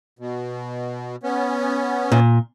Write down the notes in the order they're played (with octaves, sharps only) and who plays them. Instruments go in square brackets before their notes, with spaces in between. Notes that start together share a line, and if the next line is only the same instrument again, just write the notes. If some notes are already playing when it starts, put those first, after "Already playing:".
[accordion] B2
B3 C#4
[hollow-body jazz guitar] A#2